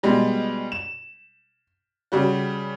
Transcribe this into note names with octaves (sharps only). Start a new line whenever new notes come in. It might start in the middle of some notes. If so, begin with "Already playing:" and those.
B2 G3 G#3
E7
C#3 G3 F#4